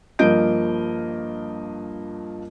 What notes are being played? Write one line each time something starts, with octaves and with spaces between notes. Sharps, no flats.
G2 F3 A#3 D#5 G6 D7